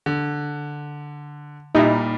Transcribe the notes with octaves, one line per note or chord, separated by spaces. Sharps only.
D3
A#2 G3 D#4 E4